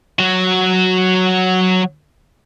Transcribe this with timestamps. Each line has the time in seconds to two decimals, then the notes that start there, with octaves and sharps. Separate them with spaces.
0.19 F#3 F#4